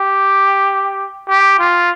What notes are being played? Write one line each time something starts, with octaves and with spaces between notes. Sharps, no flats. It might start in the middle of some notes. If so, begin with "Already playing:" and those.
Already playing: G4
G4
F4